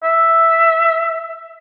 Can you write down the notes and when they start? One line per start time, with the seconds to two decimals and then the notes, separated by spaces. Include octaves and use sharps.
0.03 E5